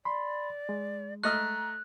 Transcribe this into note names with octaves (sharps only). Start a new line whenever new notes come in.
D5 B5 C6
G#3
A3 D#5 A#5 F6 F#6